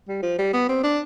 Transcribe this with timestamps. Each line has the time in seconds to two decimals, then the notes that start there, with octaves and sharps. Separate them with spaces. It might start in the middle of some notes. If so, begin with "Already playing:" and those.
0.08 G3
0.22 F3
0.38 G3
0.53 B3
0.69 C4
0.84 D4